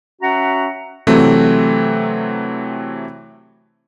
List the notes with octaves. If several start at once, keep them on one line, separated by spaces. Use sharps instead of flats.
C#4 F#4 E5 F#5 A#5
C3 E3 F#3 A3 C4